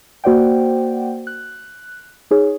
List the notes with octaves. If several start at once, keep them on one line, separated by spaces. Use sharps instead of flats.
A#3 F#4 C5 D5 F#5 G5
F#6
D#4 G#4 C#5